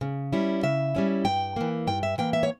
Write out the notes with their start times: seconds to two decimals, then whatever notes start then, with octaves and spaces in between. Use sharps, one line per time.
0.01 C#3
0.32 G3 C#4 E4
0.63 C#3 E5
0.95 G3 C#4 E4
1.25 G2 G5
1.56 E3 A#3
1.87 G2 G5
2.03 E5
2.18 E3 A#3 G5
2.33 E5
2.43 C#5